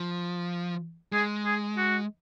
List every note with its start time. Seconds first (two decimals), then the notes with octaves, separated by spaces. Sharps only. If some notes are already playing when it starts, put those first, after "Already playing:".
Already playing: F3
1.12 G#3 G#4
1.45 G#4
1.77 F#4